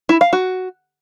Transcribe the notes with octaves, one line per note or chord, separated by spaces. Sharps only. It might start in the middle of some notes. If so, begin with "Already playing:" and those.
E4
F5
F#4